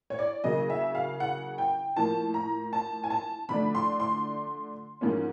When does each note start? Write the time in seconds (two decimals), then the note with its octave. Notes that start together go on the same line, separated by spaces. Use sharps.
0.10 C#5
0.19 D5
0.44 C#3 F#3 A#3 D#5
0.70 E5
0.95 F5
1.20 F#5
1.58 G5
1.96 A2 F3 A#3 A5
2.34 A#5
2.73 A5
3.04 G#5
3.10 A5
3.49 D3 F3 A3 D4 B5
3.75 C6
4.00 C6
5.01 G#2 F3 A#3 C#4